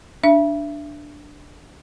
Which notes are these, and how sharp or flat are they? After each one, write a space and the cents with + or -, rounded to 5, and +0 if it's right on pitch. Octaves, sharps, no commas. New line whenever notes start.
D4 +0 E5 +25